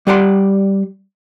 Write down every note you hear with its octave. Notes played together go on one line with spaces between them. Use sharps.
G3 G4 D5 F#5 A5 C6